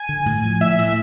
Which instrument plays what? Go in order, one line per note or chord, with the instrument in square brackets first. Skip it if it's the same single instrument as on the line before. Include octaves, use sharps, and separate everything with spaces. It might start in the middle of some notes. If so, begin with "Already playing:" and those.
Already playing: [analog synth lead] G#5
[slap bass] D3
A2
F3
[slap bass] A2 [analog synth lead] E5
[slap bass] A2